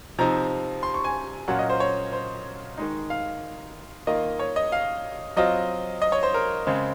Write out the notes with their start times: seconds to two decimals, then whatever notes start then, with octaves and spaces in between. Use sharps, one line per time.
0.18 C3 F3 C4 D#4 A#5
0.83 C6
0.94 C#6
1.04 G#5
1.48 A#2 F#3 C#4 F4 F#5
1.59 D#5
1.69 C5
1.80 C#5
2.13 C5
2.78 D#3 G#3 D#4
3.10 F5
4.07 D#3 A#3 F4 D#5
4.39 C#5
4.56 D#5
4.72 F5
5.36 F#3 C4 F4 D#5
6.02 D#5
6.12 C#5
6.23 C5
6.34 A#4
6.67 C#3 G#3 C4